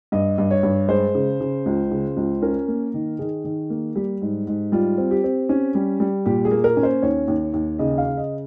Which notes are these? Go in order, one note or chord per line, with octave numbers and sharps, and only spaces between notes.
G2 D#5
G2
C#5
G2
G#3 C5
C#3
C#3
C#2
C#3
C#2
C#4 A#4
A#3
D#3
D#3 G#4
D#3
A#3
G3 G4
G#2
G#2
G3 F4
C4
G4
C4
C#4
G3
G3
A#2 G4
G#4
A#3
A#4
C#4
C5
D#2 C#5
D#2
D#2
C#3 D#5
F5
C#3
D#5